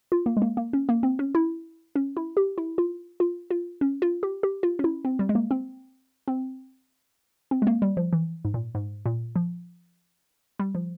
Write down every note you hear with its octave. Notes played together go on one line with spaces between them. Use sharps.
F4
A#3
G#3
A#3
A#3
C#4
A#3
C4
C#4
E4
C#4
E4
G4
E4
F4
F4
F4
C#4
F4
G4
G4
F4
C#4
E4
C4
G3
G#3
A#3
C4
C4
C4
G#3
A#3
G3
F3
E3
G#2
A#2
G#2
A#2
F3
G3
F3